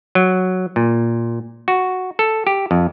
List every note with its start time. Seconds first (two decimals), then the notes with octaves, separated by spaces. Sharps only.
0.15 F#3
0.76 A#2
1.68 F#4
2.19 A4
2.47 G4
2.71 F2